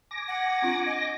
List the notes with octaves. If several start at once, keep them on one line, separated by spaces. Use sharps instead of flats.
G#5 D6 A#6
F#5
C4 D4 F4
D#5